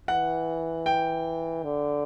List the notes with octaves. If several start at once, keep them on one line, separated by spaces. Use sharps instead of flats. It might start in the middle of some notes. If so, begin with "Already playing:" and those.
E3 F#5
G5
D3